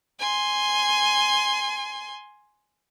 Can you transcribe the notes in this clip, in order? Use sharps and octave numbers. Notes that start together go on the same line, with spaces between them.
G#5 C6